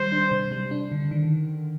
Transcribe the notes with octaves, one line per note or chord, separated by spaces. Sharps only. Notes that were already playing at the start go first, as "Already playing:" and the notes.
Already playing: D#3 G3 C5
D4
C3
G3
D4
D3
D#3